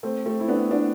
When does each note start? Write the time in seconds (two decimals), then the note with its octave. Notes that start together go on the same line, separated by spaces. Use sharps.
0.03 A3 C4
0.25 A3 C4
0.40 E4
0.48 B3 D4
0.71 B3 D4